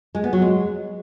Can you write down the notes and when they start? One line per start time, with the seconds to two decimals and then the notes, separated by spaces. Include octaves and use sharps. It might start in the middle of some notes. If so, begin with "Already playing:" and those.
0.15 G#3
0.24 B3
0.33 F#3
0.42 G#3